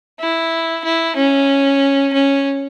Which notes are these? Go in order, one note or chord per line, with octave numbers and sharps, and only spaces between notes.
E4
E4
C#4
C#4